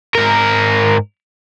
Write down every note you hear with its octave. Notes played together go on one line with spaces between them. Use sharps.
G#2 A#4